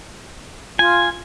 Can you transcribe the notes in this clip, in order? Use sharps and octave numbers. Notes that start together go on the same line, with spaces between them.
F4 G#5